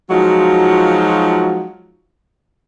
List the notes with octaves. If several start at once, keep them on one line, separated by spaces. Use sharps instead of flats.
F3 F#3 G#3 D#4 F4 F#4